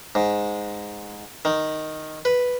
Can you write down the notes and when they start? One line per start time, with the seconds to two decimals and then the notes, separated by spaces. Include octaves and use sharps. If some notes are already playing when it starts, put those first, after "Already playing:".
0.15 G#2
1.45 D#3
2.25 B4